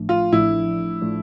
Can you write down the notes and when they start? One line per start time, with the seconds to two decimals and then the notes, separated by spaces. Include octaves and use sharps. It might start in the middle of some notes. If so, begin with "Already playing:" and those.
Already playing: A1 A2 F3 A3 D4
0.09 F4
0.32 A1 A2 F3 A3 D4 E4
1.01 A2 F3 A3 D4